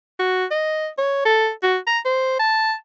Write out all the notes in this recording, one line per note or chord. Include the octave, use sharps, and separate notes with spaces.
F#4
D#5
C#5
A4
F#4
A#5
C5
A5